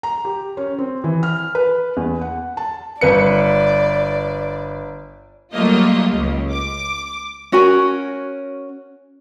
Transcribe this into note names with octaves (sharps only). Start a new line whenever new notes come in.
A#5
G4
C#4
C4
E3
F6
B4
E2
F#5
A5
G1 B4 D5 C#7
F#3 G3 A3 A#3 F4 D#5
C#2
D6
C#4 F#4 A#4 G#5